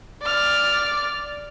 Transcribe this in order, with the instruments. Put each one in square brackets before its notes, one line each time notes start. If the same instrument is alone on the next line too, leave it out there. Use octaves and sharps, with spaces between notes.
[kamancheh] D5 F6